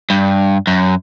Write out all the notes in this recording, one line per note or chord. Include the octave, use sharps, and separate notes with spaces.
G2
F#2